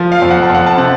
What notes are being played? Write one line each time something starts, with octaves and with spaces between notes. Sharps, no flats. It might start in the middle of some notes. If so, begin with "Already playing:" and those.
Already playing: F3
F5
F2
F#5
A5
F2 F#5
A5
C3 F#5